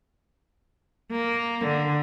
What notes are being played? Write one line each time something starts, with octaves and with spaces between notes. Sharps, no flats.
A#3
D3